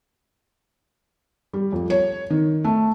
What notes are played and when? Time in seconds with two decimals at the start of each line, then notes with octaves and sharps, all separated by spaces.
1.53 G3
1.72 F2
1.90 C#5
2.30 D#3
2.64 A3